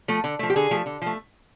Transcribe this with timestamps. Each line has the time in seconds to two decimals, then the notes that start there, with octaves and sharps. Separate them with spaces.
0.08 F3 A3
0.24 D3
0.39 F3 A3
0.50 G4
0.56 D3 G#4
0.71 F3 A3
0.86 D3
1.02 F3 A3